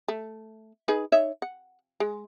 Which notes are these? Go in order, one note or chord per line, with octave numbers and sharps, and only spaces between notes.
A3
D#4 G#4 B4
D#4 C#5 E5
F#5
G#3